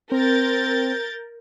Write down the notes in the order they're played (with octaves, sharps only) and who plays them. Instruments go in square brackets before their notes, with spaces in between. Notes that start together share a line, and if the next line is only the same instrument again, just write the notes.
[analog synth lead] C4 [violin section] A#4 G6 A6